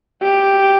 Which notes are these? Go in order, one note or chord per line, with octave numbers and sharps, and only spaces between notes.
G4